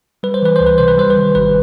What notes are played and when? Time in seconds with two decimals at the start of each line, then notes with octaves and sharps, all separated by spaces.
0.23 G3 B4
0.34 C5
0.42 E3 B4
0.56 C#2 C5
0.66 B4
0.78 C3 C5
0.88 B4
0.98 G3 C5
1.10 B4
1.16 D#3
1.35 G#1 B4